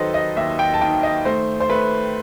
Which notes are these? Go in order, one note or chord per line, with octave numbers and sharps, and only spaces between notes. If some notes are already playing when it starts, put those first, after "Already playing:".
Already playing: D#3 F#3 A4 B4 C5 D#5
D#5
D#2 E5
G5
A5
D#3 G5
D#5
A3 C5
C5
A3 B4